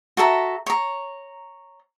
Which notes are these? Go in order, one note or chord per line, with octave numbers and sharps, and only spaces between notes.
F#4 A4 E5 A#5
C#5 A#5